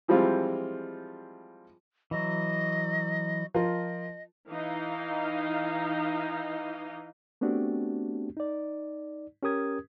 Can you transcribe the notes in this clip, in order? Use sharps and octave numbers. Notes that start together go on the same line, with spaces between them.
E3 F3 G3 G#3 C4 F4
E3 F#3 D#5
F3 F4 A#4 D#5
E3 D#4 F5
A3 B3 C4 D4 F#4 G4
D#4 D5
C#4 G4 A#4 D#6 G#6